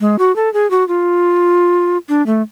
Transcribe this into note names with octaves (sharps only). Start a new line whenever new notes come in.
G#3
F#4
A4
G#4
F#4
F4
D4
A3